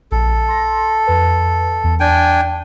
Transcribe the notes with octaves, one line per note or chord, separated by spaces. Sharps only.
A#1 A4
C6 A#6
F2 B4
E2
D4 G5 G#5